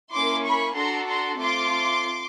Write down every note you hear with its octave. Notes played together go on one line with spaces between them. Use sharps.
A#3 C#4 E4 C6 D6
B5 C#6
D4 F#4 A4 A#5 C6
A#5 C6
A3 C4 F4 C6 D6